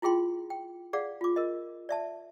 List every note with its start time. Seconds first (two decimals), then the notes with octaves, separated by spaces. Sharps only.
0.02 E4 F4 G#4 G5 C6
0.50 G5
0.93 G#4 D5 F5 F#5
1.21 F4 D6
1.36 A#4 D#5
1.89 D5 E5 A5